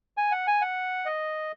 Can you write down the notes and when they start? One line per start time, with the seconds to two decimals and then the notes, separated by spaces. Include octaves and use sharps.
0.17 G#5
0.31 F#5
0.47 G#5
0.61 F#5
1.06 D#5